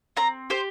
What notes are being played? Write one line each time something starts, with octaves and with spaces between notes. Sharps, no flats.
C4 A#5
G4 C5